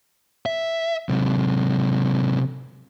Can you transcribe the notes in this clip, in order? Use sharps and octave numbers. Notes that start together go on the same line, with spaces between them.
E5
C3 F#3